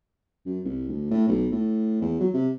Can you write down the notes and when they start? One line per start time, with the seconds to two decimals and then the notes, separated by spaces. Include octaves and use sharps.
0.46 F#2
0.65 C2
0.89 D2
1.11 A2
1.28 B1
1.51 A2
2.01 E2
2.20 F#3
2.34 C3